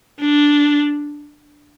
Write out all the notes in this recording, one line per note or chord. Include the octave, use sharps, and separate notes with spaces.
D4